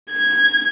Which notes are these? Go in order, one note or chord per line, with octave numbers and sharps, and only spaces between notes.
G#6